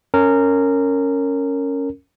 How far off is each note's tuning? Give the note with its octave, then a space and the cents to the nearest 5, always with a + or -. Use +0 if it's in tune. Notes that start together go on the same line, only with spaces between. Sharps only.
C#4 +0 A#4 -20